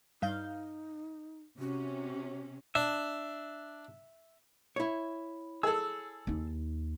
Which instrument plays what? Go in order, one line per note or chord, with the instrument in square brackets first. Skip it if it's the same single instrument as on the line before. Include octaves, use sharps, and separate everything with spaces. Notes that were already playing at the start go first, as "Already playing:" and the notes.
[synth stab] G2 F5 G6 [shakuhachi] D#4
[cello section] C3 C#4 [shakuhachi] F#4
[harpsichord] D4 [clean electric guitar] E5
[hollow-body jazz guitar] E4 C#5
[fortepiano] G#4 A4 [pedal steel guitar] E6
[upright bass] D#2 D#4